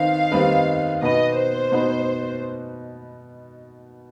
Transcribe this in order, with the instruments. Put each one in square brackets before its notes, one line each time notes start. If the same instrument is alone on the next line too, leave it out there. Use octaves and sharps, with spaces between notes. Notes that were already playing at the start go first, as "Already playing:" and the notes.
Already playing: [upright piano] D#3 C4 D#4 B4 [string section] F5
[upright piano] D#3 G3 C4 D#4 B4
[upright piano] B2 B3 D#4 B4 [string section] D#5
[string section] C5
[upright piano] B2 B3 D#4 B4